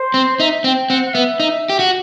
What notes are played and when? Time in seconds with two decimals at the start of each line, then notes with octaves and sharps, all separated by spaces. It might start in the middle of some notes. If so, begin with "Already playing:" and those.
Already playing: C5
0.14 C4
0.39 D#4 E5
0.64 C4 G5
0.90 C4 F#5
1.06 F#5
1.14 B3 E5
1.40 D#4
1.70 G4
1.79 F#4